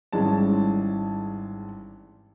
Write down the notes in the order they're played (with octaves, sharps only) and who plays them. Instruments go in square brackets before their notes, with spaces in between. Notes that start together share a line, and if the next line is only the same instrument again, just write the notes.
[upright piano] G#1 E3 G3 G#3 C#4 A5